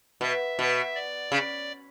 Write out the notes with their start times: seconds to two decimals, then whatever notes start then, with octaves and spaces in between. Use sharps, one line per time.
0.21 B2 E5
0.59 B2
0.95 D5
1.32 C#3